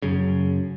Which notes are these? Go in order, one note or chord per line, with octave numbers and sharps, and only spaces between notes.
F#1 F#2 C#3